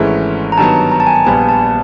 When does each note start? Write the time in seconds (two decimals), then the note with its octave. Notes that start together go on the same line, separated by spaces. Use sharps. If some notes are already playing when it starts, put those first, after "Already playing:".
Already playing: G#1 G#2 E3 A3 C#4
0.52 A#5
0.58 G2 D#3 F#3 B3 A5
0.91 A#5
1.00 A5
1.07 G#5
1.16 A5
1.25 A#1 A#2 G3 B3 G#5
1.49 A5